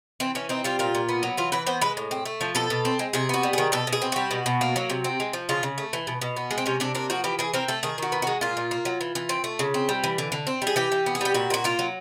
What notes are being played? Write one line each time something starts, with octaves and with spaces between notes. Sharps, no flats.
E3 C4
E3 C#4
C4 D#4
G3 F4
A#2 F4
A#2
B3
F#3
E3 F4
E3 B4
B3 C5
G#3 B4
A2
C4
A3
F3
B2 A4
B2
C4
G#3
C3 G#4
B3 F#4
G3
D#3 G#4
B2 A4
B2
G#4
C4
G3 F#4
B2
B2
A#3
F#3
C3
C4
G#3
F3
C#3 F4
C#3
A3
E3
B2
B2
B3
G#3
C4
C3 C#4
C3 D4
A#3 D4
F3 F#4
E3 G4
E3 G#4
C4 A#4
A3 A4
D#3 G#4
D#3 F#4
B3
G#3 F#4
A#2 F4
A#2
A#3
F#3
E3
E3
C4
A3
C#3
C4
G3
E3
D3
D3
C4
G3
G#4
E3 G4
E3
B3
G#4
G3 G4
A#2 F#4
A#2 F#4
A#3 F4
F#3